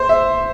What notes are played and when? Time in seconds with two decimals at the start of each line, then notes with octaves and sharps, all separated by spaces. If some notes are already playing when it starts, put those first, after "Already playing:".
Already playing: C5
0.09 E5